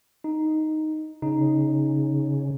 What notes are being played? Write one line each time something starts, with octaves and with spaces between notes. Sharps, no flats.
D#4
C#3 D#4